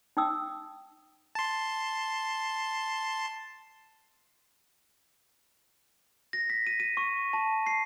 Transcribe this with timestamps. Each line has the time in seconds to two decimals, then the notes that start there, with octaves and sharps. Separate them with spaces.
0.17 D#4 G5 D#6 E6
1.35 A5 C6
6.33 A#6
6.50 B6
6.67 D#7
6.80 D#7
6.97 C#6
7.33 A5
7.66 C7